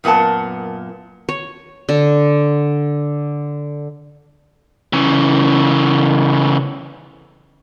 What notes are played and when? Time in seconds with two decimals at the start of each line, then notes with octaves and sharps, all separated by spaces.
0.04 F#2 A#2 B3 A#4 A5
1.29 C#5
1.89 D3
4.93 C#3 E3